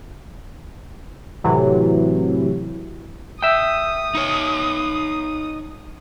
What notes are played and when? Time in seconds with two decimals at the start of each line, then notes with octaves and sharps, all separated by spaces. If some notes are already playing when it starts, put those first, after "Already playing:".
1.44 A2 C3 E3 F#3
3.43 E5 G5 D#6
4.15 D#4 C#5